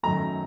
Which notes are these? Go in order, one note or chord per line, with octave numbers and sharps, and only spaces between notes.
F#2 D#3 F#3 A3 A#5